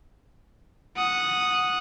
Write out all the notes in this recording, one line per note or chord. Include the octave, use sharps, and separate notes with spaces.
F#5 D#6